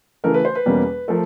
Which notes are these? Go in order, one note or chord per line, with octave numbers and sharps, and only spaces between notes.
C#3 E3 A3 A#4
B4
C5
B4
E2 B2 G3 A#3 C#4
F3 A3 A#4